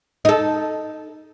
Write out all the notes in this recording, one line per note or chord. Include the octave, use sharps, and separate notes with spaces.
D#4 A4